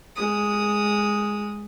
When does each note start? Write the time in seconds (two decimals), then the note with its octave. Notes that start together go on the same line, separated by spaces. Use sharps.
0.16 G#3 D#6